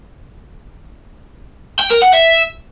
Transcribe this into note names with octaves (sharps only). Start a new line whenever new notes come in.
G5
A#4
F#5
E5